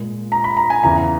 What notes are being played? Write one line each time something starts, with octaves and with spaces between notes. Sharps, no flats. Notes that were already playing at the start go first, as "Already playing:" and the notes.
Already playing: A#2 G#3
A#5
B5
A#5
G#5
E2 C#3 E3 A#5